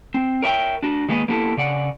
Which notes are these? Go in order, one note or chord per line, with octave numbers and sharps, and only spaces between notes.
C4
A#4 C#5 E5 G5
D4 F#4
D#3 G#3 A#3 B3 D#4
A#3 B3 E4 G4 A4
C#3 D5 F#5